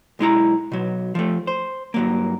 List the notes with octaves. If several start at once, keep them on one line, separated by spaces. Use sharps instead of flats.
B1 G#3 E4 A#5
B2 F#3
F3 A3
C5
G2 F#3 A#3